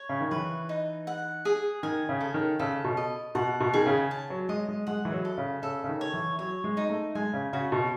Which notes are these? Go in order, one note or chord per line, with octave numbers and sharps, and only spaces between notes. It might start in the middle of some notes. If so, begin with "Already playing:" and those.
Already playing: C#5
C#3
D#3
E3 B4
D#4
F#5
G#4
D#3 G#5
C#3
A4
D#3
C#3 A4
B2
D#5
B2 F#5
B2
D#3 G#4
C#3
A5
F#3
G#3 D#5
G#3
G#3 F#5
E3
F#3
A4
C#3
C#3 A4
C#3
D#3
C#5
E3
F#3 C#5
G#3
D#4
A3
G#3 G#5
C#3
C#3 F#4
B2